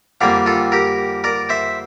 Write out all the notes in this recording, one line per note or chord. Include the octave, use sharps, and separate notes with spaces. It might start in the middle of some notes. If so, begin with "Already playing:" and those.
F2 D3 G3 A#3 D5 F5
F4 A4
G4 A#4
A#4 D5
C5 E5